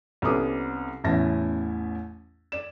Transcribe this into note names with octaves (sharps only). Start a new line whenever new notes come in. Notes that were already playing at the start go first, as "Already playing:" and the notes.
C2 B3 C#4 A4 D6 D#6
A1 E2 C#4 E5 A5 A#6
D5 E7